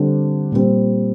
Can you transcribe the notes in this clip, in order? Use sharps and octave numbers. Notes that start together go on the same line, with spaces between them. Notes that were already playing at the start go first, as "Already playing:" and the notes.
Already playing: D3 G3 C4
A#2 G3 C4